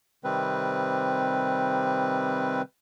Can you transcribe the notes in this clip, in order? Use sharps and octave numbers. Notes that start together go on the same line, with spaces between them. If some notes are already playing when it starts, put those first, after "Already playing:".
C3 D#3 G3 C4 B4